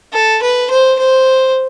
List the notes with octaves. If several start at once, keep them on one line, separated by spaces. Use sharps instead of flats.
A4
B4
C5
C5